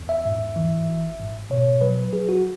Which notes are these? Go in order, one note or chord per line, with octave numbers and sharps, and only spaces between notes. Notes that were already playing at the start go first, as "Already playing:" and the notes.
Already playing: E2
E5
G#2
E3
G#1
G#2
B2 C#5
F#3 B4
F#3 G#4
F#4